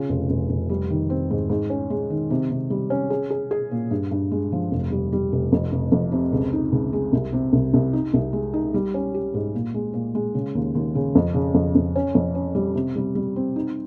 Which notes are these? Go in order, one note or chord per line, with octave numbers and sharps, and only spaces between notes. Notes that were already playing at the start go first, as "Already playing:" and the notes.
Already playing: C#3 F4
F1
F1
F1
G3
D#3
C4
G#2
G#2
C#4
G#3
D#3
C3
C3
G3
C#4
G#4
G#4
G#4
A#2
G2
G2
G#3
F3
F1
G3
G3
F1
F2
F1
F2
C3
C#2
D#4
C#2
G#3
C2
C3
C2
C2
D#4
C2
G#3
D#4
G3
C#4
G4
G#2
A#2
G#3
A#2
G#3
C#3
D#2
D#2
C#3
F2
C#3
F2
F2
C#4
F2
C#4
G3
C3
G3
G3
C4
D#4